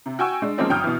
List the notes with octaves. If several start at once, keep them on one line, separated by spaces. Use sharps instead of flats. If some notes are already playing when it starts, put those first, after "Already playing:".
C3
F#4 G5 G#5 C#6 E6
G#3 D4
F3 G#3 A#3 C4 C#4 D#4
G1 F#3 G5 D#6 F6 G6
B2 E3